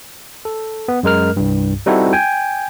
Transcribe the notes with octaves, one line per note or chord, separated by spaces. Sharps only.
A4
B3
F#2 G#3 A#4 F6
C2 G2
G3 C4 D#4 E4 F#4 A4
G5 G#5